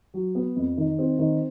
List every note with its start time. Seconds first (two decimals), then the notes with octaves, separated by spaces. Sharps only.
0.14 F#3
0.35 B3
0.56 F2
0.77 D#3
0.99 C4
1.19 D#3